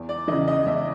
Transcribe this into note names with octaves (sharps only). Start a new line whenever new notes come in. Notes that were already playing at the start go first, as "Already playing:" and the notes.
Already playing: E2
D5
C#3 E3 D#5
D#5
E2 E5